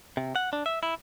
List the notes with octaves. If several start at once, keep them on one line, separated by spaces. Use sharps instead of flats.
C3
F#5
D4
E5
E4